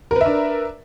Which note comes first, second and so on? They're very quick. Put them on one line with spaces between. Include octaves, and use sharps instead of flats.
A#4 B4 E5 D4